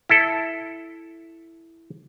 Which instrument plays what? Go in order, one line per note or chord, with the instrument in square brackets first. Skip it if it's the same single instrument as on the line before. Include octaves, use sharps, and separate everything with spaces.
[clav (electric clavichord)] E4 A4